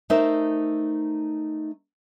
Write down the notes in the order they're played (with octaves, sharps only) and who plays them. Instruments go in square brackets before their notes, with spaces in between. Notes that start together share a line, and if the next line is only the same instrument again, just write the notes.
[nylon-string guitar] A3 D#4 A#4 C5 E5